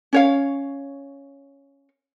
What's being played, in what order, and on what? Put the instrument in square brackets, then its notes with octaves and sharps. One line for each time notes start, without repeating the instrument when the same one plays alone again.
[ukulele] C#4 C#5 F5